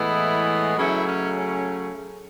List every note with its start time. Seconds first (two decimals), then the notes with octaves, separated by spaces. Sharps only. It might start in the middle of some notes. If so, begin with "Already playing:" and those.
Already playing: A2 E3 G#3 B3 E4
0.77 C#3 F#3 A3 C#4 E4
1.06 C#4
1.35 C#4